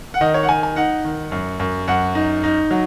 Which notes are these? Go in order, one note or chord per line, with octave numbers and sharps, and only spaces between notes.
F#5
D#3 D#5
C#5
F#5
D#3 G#5
G#5
D#4 F#5
D#3
F#2
F#2
F#2 F#5
D#4
D#4
F#3